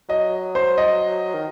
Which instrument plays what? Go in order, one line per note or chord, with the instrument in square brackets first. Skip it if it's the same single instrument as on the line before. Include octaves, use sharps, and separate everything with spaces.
[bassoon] F#3 [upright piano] D#5
[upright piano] C5
D#5
[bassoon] D#3